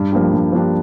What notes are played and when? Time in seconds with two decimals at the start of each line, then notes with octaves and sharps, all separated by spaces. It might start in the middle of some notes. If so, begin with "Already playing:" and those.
Already playing: G2
0.12 F3 A#3 D4 G4
0.33 G2
0.52 F3 A#3 D4 G4